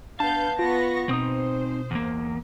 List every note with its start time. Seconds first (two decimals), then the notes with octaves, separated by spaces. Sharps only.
0.20 B3 D4 F5 A5 G6
0.59 B3 F4 C#6 A#6
1.09 B2 C4 D#4 C5 D#6
1.91 E2 A#3